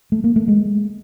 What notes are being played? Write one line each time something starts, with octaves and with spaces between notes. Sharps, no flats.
A3
A#3
A3
G#3